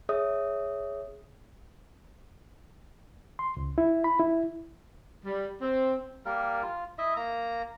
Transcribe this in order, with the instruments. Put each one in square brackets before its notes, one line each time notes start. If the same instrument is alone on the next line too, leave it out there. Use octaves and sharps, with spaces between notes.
[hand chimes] G#4 C#5 E5 D#6
[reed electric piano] C6
C#2
E4
B5
E4
[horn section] G3
C4
[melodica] G3 A#3 A#4
F4
E4 D#5 E5
A#3 A#5